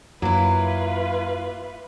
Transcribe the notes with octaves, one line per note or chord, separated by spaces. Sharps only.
F#2 F#3 A#3 E4 F4 B4